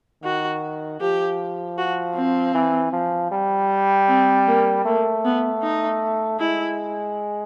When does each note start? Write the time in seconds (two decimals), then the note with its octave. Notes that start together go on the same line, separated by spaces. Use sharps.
0.23 D#3 F#4
1.00 F3 G4
1.78 F#4
2.15 C4
2.54 E3
2.92 F3
3.32 G3
4.08 C4
4.47 A#3
4.85 A3 A#3
5.25 B3
5.63 D#4
6.40 G#3 E4